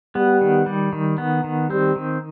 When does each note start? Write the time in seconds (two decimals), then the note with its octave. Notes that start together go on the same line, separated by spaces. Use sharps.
0.15 G3 B3
0.41 D#3
0.66 G3
0.93 D#3
1.18 B3
1.44 D#3
1.70 G3 C4
1.96 D#3